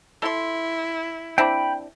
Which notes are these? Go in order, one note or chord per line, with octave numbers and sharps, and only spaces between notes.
E4 A4 C6
C4 D4 E4 G5 B5